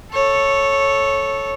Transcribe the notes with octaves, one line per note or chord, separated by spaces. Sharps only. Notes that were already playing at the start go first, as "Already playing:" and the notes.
A4 C#5